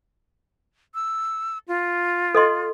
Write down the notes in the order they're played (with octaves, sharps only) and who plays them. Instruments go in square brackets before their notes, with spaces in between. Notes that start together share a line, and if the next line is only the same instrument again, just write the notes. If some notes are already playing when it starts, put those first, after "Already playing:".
[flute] E6
F4
[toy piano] A4 D#5 C6